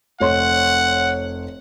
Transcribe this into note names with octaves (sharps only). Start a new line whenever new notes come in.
F1 C#5 F#5 C6